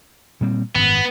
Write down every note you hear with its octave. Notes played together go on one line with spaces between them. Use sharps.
A#2 G3 C4
G#1 F#2 B3